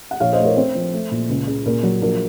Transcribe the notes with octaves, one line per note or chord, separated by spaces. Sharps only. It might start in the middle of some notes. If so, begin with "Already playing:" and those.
F#5
A#1 C#5 F5
C5 D#5
A3
A#4 C#5
C4 C5
F3
A3
A#2
C#2
C#3
A#2 A#4
F#3
A#1 A#4